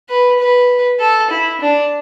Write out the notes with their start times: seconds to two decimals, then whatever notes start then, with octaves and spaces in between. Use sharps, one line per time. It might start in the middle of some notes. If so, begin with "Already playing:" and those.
0.09 B4
0.39 B4
0.99 A4
1.30 E4
1.60 D4